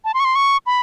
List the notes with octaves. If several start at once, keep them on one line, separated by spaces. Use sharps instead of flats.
A5
C6
C#6
C6
C#6
B5